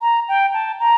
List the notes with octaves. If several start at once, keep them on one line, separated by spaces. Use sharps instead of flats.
A#5
G5
A5
A#5